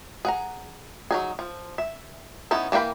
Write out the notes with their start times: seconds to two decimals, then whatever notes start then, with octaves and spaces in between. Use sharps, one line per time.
0.25 G#4 F#5 A#5
1.11 F#3 D#4 G#4
1.39 F3
1.78 E5
2.51 B3 C#4 D#4 E4
2.72 E3 A#3 D4 G5 B5